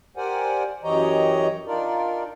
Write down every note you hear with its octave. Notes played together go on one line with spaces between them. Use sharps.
G4 A#4 C5 D5 F#5 G#5
F#2 E3 G4 C#5 D#5 A#5
D4 D#4 F4 A#4 D5